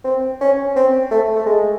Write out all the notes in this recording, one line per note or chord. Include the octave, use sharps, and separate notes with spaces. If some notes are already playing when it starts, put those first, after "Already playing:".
C4
C#4
C4
A3
A3
G#3